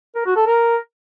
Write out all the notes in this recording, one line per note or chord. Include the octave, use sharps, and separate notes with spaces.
A#4
F#4
A4
A#4